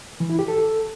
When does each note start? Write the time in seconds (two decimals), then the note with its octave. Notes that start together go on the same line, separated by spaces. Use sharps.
0.20 E3
0.30 E4
0.39 G4
0.48 A4